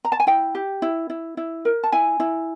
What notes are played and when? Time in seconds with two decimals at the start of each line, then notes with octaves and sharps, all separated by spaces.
0.05 A#5
0.12 A5
0.20 G#5
0.27 E4 G5
0.55 G4
0.82 E4
1.10 E4
1.37 E4
1.65 A#4
1.84 A5
1.92 E4 G#5
2.20 E4